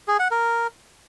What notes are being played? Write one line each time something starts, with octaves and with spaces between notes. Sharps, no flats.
G#4
F#5
A#4